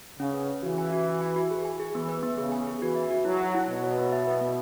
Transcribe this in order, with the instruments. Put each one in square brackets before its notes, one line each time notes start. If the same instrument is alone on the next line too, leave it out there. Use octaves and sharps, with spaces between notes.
[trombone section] C#3 [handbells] C#4
[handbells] B4
C#4
[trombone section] E3 [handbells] F#4
[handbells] G#5
F#4
F#4
G#5
F#4
G#4
G#5
G#4
[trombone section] E3 [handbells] B3
[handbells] B4
B3
[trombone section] C#3 [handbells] G#4
[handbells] G#5
G#4
[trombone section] E3 [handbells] F#4
[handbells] E5
F#4
[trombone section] F#3 [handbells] E4
[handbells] F#5
E4
[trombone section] B2 [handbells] F#5
[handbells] C#5
B3
E5
B4
B3